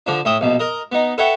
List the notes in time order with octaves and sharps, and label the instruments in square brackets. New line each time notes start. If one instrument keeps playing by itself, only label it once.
[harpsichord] D3 F3 D4
A2 E5 G5 D#6
A#1 B2
A#4 D#5
B3 D#4
A4 B4 C#5 E5 F#5 G5